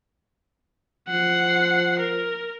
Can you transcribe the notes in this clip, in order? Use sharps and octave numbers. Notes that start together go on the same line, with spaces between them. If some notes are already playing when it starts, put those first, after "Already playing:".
F3 F#5 C7
A#4